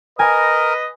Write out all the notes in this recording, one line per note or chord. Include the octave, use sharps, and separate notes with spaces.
A#4 B4 D#5 G#5